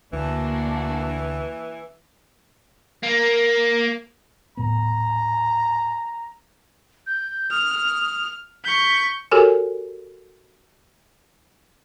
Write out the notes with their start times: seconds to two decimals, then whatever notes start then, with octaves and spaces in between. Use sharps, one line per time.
0.13 D2 E3 A#3 D4 F#4
3.03 A#3
4.57 D#1 A2 B3 A#5
7.07 G6
7.51 D#6 F6
8.64 C#6 G6 B6
9.31 F#4 G4 A4 A#4 C#5 G#5